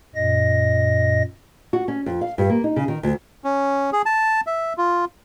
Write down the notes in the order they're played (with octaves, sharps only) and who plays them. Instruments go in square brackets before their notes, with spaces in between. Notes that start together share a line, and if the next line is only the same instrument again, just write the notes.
[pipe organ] F#2 A#2 D#5 A#6
[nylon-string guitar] F#4
C#4
F2
F5
G2
A#3
D#4
C#3
D#3
D2
[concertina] C#4
G#4
A5
E5
F4